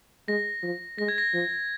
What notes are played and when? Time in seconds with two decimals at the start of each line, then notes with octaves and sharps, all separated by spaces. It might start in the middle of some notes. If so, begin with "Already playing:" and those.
0.28 G#3 A#6
0.63 F3
0.98 G#3 A#6
1.08 G#6
1.18 A#6
1.33 F3